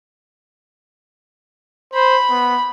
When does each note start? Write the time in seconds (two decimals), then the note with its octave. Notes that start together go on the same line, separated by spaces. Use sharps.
1.94 C5 B5
2.30 B3